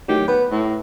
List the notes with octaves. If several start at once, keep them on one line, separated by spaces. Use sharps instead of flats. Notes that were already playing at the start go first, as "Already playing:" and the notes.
A2 D#3 F#3 G4
B3 B4
A2